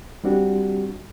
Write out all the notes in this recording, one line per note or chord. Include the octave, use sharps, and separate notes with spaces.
G3 C4 D4 F#4 G4